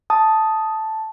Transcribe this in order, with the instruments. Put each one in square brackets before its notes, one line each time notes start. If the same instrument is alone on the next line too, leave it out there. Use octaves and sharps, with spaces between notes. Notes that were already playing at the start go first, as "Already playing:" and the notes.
[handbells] A5 [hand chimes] D#6